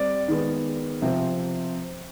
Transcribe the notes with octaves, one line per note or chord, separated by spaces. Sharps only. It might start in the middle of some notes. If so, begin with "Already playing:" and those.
Already playing: G3 C4 D5
D#3 G#3 B3
C3 F3 C4